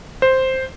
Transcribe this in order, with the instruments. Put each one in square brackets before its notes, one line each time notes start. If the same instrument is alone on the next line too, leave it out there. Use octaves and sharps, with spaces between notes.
[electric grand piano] C5